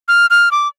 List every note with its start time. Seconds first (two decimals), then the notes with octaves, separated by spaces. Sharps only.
0.08 F6
0.30 F6
0.51 D6